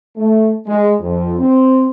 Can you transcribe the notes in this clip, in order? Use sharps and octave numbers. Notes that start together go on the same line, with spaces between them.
A3
G#3
F2
C4